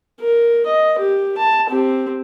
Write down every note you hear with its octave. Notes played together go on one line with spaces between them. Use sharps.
A#4
D#5
G4
A5
C4 G4